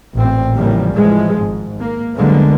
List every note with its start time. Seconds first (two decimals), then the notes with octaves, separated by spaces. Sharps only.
0.14 A1 A#2 C4
0.56 A2 C#3 E3 F3 G3 A#3
0.94 A2 E3 F3 G#3
1.37 G#1 G#2
1.80 A#3
2.15 C2 D3 F#3 G#3 A#3 B3